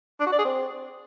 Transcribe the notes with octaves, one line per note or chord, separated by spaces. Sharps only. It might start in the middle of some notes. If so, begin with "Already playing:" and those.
D4
F#4
D5
G#4
C4